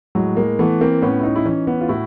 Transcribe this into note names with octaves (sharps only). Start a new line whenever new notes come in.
A2 F#3 G#3
G#3 A#3
E3 A3 B3
A#3 C4
A2 B3 C#4
E4
C#4 D#4
E4
E3 C#4 D#4
B3 C#4
F4
A2 E4 F#4